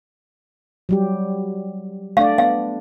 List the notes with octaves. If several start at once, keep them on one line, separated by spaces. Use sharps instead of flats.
F#3 G3 G4
A3 D4 D5 F5
B3 F5